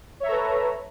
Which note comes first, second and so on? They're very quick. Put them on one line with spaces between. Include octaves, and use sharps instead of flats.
C#5 E5 A#5 A4 B4